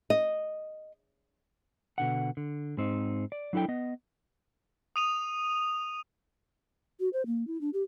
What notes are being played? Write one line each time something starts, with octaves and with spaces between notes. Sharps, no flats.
D#5
B2 D3 F#5
D3
G#2 C4 D#4
D5
F#3 D4 E4 A4 G5
B3 D#5
D#6 D#7 F7
F#4
C5
A#3
E4
D4
G4